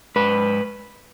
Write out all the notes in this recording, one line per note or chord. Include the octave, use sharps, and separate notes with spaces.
G#2 B4